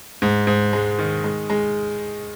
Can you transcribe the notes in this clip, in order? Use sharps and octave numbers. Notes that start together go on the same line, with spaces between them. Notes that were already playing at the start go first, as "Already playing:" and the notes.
G#2
G#2
G#3
D#3
G#3
G#3